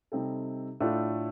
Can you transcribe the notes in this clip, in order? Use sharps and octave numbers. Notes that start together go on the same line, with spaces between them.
C3 G3 C4 D#4 A4
A2 A3 D4 F4 A4